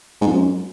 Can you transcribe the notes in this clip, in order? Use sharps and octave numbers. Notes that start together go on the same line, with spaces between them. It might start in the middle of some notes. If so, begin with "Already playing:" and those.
G#2
F2
F#2